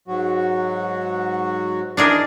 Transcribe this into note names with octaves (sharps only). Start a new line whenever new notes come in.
G#2 F#3 F#4
E3 D4 D#4 G#4 A#4